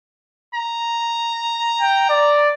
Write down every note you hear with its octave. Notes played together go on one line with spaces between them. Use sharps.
A#5
G5
D5